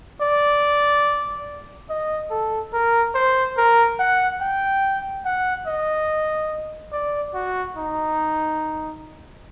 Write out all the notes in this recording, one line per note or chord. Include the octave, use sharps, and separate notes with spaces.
D5
D#5
A4
A#4
C5
A#4
F#5
G5
F#5
D#5
D5
F#4
D#4